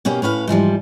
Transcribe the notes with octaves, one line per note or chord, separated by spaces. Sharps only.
B2 A#3 C#4 G4
A2 C#4 B4 F5
G#2 E3 F3 G3